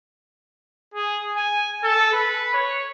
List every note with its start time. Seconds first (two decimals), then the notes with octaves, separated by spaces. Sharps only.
0.94 G#4
1.37 G#5
1.83 A4
2.13 B4
2.54 C#5